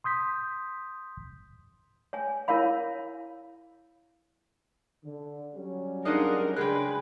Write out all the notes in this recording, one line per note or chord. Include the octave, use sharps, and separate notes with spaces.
C6 D#6 G6 B6
C#5 G#5
E4 A#4 C#5 F5 B5
D3
F#3 G3 C#4
G#3 D4 D#4 A#4 D#5 F5 F#5
C#3 G#3 D4 G#4 B4 G5 F#6